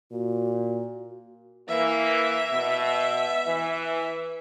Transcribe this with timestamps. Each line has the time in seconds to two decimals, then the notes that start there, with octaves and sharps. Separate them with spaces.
0.12 A#2 F#4
1.68 E3 A#3 E5
2.52 B2
3.47 E3